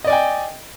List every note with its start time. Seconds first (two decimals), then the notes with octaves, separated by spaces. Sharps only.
0.04 D#5
0.07 D5
0.10 G#5
0.13 G5